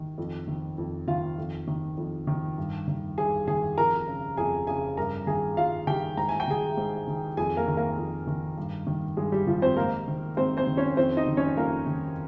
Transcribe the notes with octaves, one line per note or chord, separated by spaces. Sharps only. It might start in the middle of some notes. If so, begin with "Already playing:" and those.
Already playing: D#3
F2
D#3
F2
D#3 F4 F5
F2
D#3
F2
D#3
G2
D#3
G2 G#4 G#5
D#3 G#4 G#5
F2 A#4 A#5
C#3
F2 G#4 G#5
C#3 G#4 G#5
G2 A#4 A#5
D#3 G#4 G#5
G2 F4 F5
D#3 G4 G5
G#2 A#5
G#5
G5
D#3 G#4 G#5
G#2
D#3
F2 G#4 G#5
A#3 A#4
D#3
A#3 A#4
F2
D#3
G2
D#3
G2 G#3 G#4
G3 G4
D#3 F3 F4
C4 C5
G#2 A#3 A#4
D#3
G#2 C4 C5
C4 C5
D#3
C#4 C#5
F2 C4 C5
D#4 D#5
D#3
C#4 C#5
F2 A#3 A#4
D#3